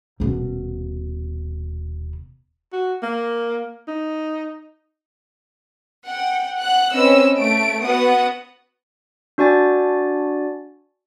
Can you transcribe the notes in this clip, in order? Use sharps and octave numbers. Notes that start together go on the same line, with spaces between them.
D#1 B2
F#4
A#3
D#4
F#5 G5
F#5 F#6
C4 C#4 B4 D#5 E6
A3 D7
B3 F#4 F#5 D#6
D4 F#4 D5 G#5 A6